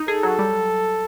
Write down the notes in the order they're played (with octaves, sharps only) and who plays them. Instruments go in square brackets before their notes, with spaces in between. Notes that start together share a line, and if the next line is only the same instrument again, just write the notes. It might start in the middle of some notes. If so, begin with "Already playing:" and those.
Already playing: [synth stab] D#4
[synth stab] G#4 [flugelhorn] A4
[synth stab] F#3
G3